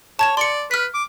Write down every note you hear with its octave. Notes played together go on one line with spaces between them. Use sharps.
C#5 A5 G#6 E7
D5 C6 C#7
B4 F6 B6
D6